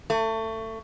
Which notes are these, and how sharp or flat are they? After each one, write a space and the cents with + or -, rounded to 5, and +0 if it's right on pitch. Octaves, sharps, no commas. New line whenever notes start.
A3 +25